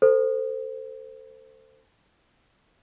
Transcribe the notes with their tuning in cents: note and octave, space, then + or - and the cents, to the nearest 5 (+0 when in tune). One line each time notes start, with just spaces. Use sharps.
A4 +25 C5 -10